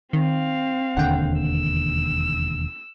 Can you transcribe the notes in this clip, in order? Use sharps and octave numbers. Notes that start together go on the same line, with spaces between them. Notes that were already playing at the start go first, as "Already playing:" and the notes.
D#3 C4 F5
E1 D#2 D3 F#5 G5
E6